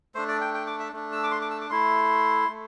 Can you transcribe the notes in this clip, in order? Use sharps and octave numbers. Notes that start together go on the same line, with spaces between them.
A3 D4 C5
D5
G5
G5
D6
E5
A3 D4
E6
D6
C6
D6
E6
D6
A3 E4 C6
A3